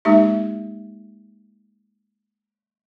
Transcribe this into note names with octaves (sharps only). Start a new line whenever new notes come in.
G#3 A#3 D#4 G4 E5